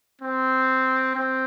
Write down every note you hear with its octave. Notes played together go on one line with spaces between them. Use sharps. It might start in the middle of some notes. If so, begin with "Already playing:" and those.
C4
C4